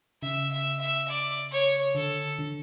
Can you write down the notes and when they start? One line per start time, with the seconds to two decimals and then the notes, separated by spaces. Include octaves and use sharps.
0.23 C#3 E5
0.52 E5
0.80 E5
1.09 D5
1.52 C#5
1.95 D3 A4
2.39 D3